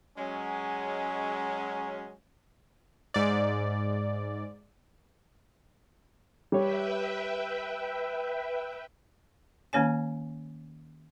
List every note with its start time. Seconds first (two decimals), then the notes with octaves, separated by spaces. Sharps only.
0.17 F#3 G#3 C#4
3.14 G#2 D5
6.52 G3 B4 C#5 E5 G5
9.73 D#3 A#3 C#4 C#5 G#5